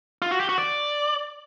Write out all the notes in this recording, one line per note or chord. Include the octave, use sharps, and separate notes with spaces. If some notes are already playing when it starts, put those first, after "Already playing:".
F4
F#4
G4
F#4
D5